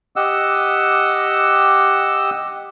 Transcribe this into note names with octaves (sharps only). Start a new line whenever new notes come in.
G4 D#5 F#5 E6